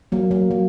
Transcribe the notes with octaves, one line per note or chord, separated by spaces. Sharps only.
F#3 A#3
F#3 A#3
F#3